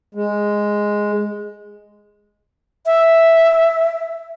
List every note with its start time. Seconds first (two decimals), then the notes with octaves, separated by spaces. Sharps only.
0.15 G#3
2.86 E5